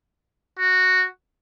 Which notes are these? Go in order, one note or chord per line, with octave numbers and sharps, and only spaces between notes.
F#4